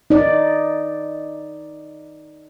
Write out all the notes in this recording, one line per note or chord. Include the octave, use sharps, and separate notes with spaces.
D#4 D5